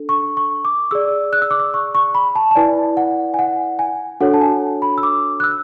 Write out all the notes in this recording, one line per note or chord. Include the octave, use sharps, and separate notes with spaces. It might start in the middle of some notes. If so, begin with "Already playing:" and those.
Already playing: D4 A4
C#6
C#6
D6
G#4 D5 E6
F#6
E6
D6
E6
C#6
C#6
B5
A5
A5
E4 B4 D5 G#5
F#5
G#5
F#5
G#5
D4 F#4 A4 C#5 F#5
A5
G#5
B5
E6
D6
F#6
E6